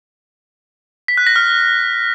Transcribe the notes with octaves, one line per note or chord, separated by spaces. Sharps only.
B6
F#6
A#6
F6